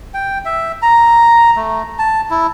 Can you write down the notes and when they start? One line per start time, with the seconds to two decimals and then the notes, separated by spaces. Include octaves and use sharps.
0.14 G5
0.45 E5
0.82 A#5
1.56 A3
1.99 A5
2.30 E4